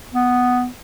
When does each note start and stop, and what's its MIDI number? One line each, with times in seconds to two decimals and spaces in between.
0.14 0.67 59